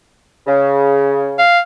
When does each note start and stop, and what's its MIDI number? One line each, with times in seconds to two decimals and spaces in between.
0.47 1.38 49
1.38 1.60 77